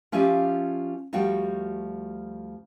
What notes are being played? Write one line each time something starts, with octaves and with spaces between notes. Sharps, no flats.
F3 C#4 F4 G4 D5 E5
D2 F3 G3 F#4 G5